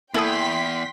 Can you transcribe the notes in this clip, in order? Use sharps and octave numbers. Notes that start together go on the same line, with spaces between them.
E2 A#3 E4 A4 G5 C6 D#6 B6